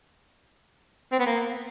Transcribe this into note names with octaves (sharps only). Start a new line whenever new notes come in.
C4
B3
A#3